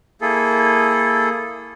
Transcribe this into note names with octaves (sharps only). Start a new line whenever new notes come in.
A#3 E4 G#4 A4